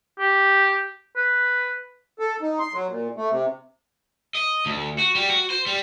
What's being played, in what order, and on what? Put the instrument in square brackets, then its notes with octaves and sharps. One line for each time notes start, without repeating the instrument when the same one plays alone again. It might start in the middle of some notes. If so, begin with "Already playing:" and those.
[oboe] G4
B4
[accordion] A4
D#4
C6
F#3
A#2
A3
C3
[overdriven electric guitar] D#5
D2
F#4
G3
F#4
C5
G3